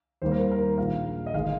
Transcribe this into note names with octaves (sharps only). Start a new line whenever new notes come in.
D#2 D#3 G3 A#3 C5
A#4
A#4
A#1 A#2 G#3 F5
D#5
G1 D#3 G#3 F5